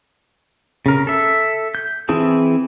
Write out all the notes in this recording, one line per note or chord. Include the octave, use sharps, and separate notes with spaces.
C#3 A#4
A4 E5
G6
E3 C4 E4 G#4 A5